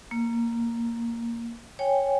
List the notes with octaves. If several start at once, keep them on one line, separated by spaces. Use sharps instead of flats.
A#3
C#5 G5 G#5